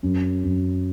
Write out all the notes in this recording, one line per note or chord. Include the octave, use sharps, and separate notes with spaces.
F#2
F#2